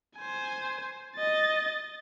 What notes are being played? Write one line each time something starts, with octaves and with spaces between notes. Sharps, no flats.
C5 G#5
D#5 A6